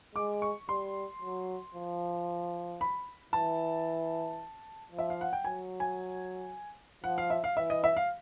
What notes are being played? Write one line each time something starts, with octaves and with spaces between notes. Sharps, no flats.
G#3 D6
C#6
G3 C6
F#3
F3
B5
E3 A5
F3
E5
F5
F#5
G5
F#3 G#5
G#5
F3 F#5
F5
E5
F5
E3 E5
D#5
E5
F5